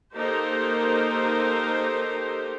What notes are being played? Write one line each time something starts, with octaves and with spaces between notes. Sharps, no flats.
A#3 D#4 G4 A4 A#4 C5